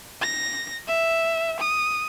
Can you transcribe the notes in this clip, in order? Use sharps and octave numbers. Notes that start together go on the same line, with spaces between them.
A#6
E5
D#6